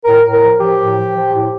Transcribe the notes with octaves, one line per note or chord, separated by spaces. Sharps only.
A2 A#4
A2
A#4
F3
F3 G4
A2
F3
F3
A2